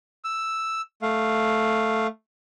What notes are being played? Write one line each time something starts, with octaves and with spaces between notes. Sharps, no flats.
E6
A3 F5